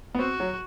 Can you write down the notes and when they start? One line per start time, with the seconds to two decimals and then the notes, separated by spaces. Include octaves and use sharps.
0.15 B3
0.19 C4 F#4
0.40 F#3